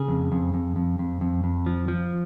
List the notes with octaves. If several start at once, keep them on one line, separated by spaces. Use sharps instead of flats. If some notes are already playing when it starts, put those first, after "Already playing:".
Already playing: C#3 G#4
F2
F2
F2
F2
F2
F2
F2
F3
F3